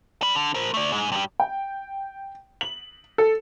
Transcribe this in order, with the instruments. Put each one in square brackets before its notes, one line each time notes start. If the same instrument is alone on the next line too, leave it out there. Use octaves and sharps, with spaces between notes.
[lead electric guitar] D5 B5
D3
A#4 C5
A3 D5
G#2 G#3
G2 G3
[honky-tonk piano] G5
F#7
A4